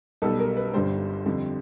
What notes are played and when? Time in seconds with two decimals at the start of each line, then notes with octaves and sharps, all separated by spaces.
0.22 B1 B2 G3 A4
0.39 A#4
0.57 B4
0.74 G1 G2 D3 G3 C5
1.26 F2 D3 G3